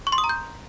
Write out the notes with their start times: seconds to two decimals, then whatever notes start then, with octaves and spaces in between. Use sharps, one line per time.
0.07 C#6
0.12 C6
0.18 D#6
0.24 A#5
0.29 G6